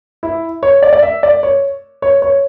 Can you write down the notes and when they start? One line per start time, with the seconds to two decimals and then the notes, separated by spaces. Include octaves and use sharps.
0.23 E4
0.63 C#5
0.83 D5
0.93 D5
1.02 E5
1.23 D5
1.43 C#5
2.02 C#5
2.22 C#5